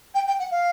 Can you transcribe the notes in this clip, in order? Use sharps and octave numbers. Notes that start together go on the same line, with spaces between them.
G5
G5
F#5
F5